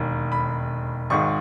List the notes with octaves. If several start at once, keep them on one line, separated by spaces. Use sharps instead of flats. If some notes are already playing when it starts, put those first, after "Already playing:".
Already playing: E1 D#2 D#3
B5
G#1 G#2 D#3 C#6